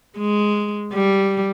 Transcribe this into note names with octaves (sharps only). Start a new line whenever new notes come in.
G#3
G3